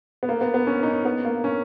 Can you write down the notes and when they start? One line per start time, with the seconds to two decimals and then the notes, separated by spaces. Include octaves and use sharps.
0.23 B3
0.29 A#3
0.41 B3
0.54 B3
0.67 C#4
0.83 D#4
0.93 C#4
1.05 B3
1.25 A#3
1.44 C#4